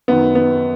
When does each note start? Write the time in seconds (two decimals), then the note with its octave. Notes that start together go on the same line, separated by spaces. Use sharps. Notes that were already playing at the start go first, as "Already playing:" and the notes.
0.08 F#2 D#3 B3
0.35 B3